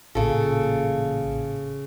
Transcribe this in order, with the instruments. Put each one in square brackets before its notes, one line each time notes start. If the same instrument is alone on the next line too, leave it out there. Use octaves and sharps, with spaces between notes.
[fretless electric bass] A1 A#2 [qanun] C#3 A4